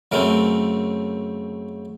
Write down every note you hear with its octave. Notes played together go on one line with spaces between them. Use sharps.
F#2 C#3 A3 C4 A#4